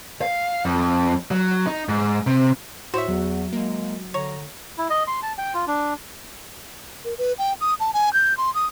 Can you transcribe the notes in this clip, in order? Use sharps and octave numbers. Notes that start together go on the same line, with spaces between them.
F5
F2
F#3
D#4
G#2
C3
A2 F#4 C5 C#5 E5
E2 F#3
G#3 A#3
D3 C#5 A#5
E4
D#5
C6
A5
G5
F4
D4
A#4
B4
G5
D#6
A5
G#5
G6
C6
D#6